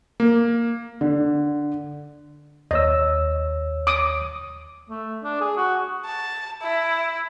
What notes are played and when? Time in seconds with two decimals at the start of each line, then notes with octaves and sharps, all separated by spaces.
0.20 A#3
1.01 D3
2.71 D#2 C#5 D#5 E6
3.87 D6 D#6
4.90 A3
5.24 D4
5.41 G#4
5.57 F#4
6.05 A5
6.61 E4